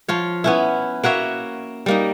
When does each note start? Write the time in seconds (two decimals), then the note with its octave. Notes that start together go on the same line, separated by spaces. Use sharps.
0.08 F3 F4 C#5
0.44 B3 C#4 E4
1.04 A#3 F#4 C#5 E5
1.86 G3 A#3 D#4